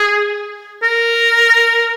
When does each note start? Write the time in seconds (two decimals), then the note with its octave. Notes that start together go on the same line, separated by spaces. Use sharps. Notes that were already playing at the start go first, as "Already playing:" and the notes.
Already playing: G#4
0.83 A#4